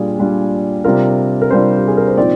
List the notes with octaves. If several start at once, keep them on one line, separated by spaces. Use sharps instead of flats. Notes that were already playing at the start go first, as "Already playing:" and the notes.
Already playing: A#2 G3 D4 F4 G#4
A#2 G3 D4 F4
C3 G3 D4 F4 A#4
A#4
C3 G3 D4 F4 C5
G4
G#4
A#4
C5
A#2 F3 C4 D#4 D5